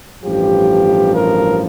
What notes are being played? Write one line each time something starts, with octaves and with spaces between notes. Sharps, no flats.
A1 G2 F3 G4
A#4